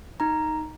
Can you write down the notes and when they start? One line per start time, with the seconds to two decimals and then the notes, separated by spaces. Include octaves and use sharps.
0.20 D#4 A#5